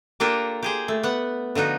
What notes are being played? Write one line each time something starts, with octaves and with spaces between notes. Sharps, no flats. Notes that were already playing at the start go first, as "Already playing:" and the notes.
A#3 D4 F4 G4 A4 A#4
G4 G#4 C5
A3
B3 F#5
D3 F3 D#4 F#4